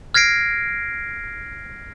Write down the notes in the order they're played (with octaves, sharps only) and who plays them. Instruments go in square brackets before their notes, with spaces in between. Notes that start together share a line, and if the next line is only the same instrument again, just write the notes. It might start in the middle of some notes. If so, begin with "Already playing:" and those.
[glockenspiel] F6 G#6 A#6 C7 D7